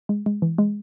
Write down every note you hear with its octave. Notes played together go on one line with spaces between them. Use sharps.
G#3
G#3
E3
G#3